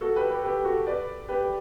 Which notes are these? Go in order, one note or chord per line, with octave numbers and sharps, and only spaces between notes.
F#4 A4
G4 B4
G4 B4
G4 B4
F#4 A4
B4 D5
G4 B4